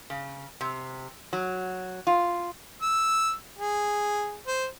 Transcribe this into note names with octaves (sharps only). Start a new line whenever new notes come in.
C#3
C3
F#3
F4
E6
G#4
C5